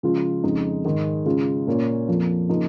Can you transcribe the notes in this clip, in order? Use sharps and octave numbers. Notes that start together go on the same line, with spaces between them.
C#3 F3 G#3 F4
F2 C#3 G#3 D#4
G#2 D#3 G#3
C#3 G#3 F4
A#2 A#3 C#4 F4
F2 F3 A#3
C#3 F3 A#3 D#4